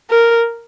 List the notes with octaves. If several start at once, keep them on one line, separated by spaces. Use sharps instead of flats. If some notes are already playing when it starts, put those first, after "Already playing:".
A#4